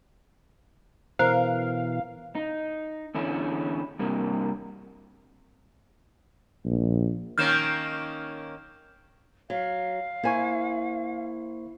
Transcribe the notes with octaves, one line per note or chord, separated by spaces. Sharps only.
B2 E3 A#4 C5 F5
D#4
E2 D3 C#4 E4
G2 C3 A#3
A#1
D#3 A#3 C#4 F6 G6 E7
F#3 F5
A#3 E4 C5 G#5 C#6